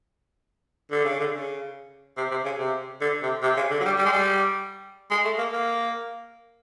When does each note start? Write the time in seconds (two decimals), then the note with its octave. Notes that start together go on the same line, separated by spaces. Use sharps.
0.91 D3
1.05 C#3
1.19 D3
1.33 C#3
2.17 C3
2.31 C3
2.45 C#3
2.58 C3
3.01 D3
3.22 C3
3.43 C3
3.56 C#3
3.70 D3
3.80 F#3
3.85 G3
3.98 G3
4.05 G#3
4.12 G3
5.11 G#3
5.24 A3
5.38 A#3
5.52 A#3